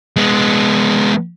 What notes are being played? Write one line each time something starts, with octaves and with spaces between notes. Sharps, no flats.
G#3 B3